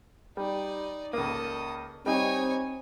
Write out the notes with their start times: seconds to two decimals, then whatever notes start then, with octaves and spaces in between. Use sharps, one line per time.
0.37 G3 D#4 D5
1.13 C#2 A#3 A4 D#6
2.06 G3 C4 D#4 C#5 G#5